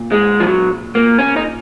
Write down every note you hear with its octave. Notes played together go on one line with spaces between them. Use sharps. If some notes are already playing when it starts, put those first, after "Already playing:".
Already playing: A#2
G#3
F3
F#3
A#3
C#4
D#4